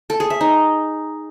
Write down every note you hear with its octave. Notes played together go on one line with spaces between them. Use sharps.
A4
G#4
E5
D#4